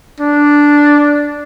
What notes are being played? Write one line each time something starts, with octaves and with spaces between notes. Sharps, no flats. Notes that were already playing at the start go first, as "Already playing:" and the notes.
D4